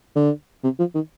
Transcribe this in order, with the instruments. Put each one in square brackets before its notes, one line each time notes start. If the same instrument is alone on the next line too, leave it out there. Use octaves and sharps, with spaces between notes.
[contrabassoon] D3
C3
F3
D#3